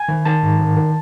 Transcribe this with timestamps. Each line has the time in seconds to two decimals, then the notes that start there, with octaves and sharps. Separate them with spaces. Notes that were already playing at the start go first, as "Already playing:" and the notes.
Already playing: G#5
0.09 D#3
0.25 D#3 A5
0.43 G#2
0.60 D#3
0.77 D#3